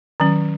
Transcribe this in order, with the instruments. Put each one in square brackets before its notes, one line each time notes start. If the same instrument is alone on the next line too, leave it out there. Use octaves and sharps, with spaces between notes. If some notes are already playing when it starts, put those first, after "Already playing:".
[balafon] D#3 F#3 C#4